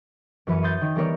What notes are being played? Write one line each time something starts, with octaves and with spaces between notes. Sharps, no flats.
F#2 E3 B4 B5 C#7 D#7
C6 D#6 G6 A6
D#3 G6
E3 G3 B3 A#4 C#5 D5